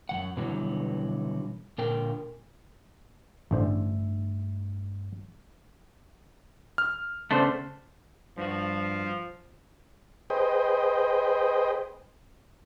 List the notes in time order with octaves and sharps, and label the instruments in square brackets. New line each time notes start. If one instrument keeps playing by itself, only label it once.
[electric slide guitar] F#2 D#3 F#5
B2 D3 E3 F#3 G3
A#2 D3 A#4 G5
[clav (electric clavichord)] A1 D3 C5 [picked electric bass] G2 A3
[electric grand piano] F6
[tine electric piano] C#3 B3 C#4 [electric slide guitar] A3 D4 C5
[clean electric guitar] G2 F#4 [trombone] F3
[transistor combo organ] G#4 B4 C5 D#5 G5